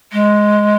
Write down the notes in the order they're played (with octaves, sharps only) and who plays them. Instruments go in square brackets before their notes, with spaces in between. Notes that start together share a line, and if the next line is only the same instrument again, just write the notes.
[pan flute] G#3